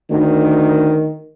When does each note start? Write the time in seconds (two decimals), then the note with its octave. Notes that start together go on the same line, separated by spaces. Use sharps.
0.10 D2 D#3